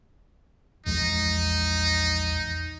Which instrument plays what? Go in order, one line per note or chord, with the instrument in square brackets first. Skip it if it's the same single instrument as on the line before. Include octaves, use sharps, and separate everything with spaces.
[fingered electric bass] A#1 E2 G#3 [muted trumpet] D#4